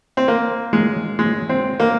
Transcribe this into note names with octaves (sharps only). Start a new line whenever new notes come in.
C4
A#3
G#3
G#3
C4
A#3